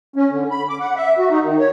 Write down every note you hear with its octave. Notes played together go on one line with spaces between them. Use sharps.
C#4
D3
B5
D6
F#5
E5
F#4
D#4
D#3
C#5